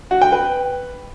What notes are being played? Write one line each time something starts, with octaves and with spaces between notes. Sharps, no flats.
F#4
G5
B4